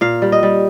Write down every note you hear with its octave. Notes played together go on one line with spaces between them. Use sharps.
A#2 F5
G3
D#5
G3